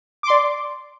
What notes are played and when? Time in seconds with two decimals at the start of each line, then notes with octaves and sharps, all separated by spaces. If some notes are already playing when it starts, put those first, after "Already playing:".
0.23 D6
0.27 C6
0.30 D5